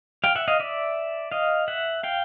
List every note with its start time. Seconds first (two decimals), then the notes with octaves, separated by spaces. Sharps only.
0.24 F5 G5
0.35 E5 F#5
0.48 D#5 F5
0.60 D5 E5
1.32 D#5 F5
1.68 E5 F#5
2.03 F5 G5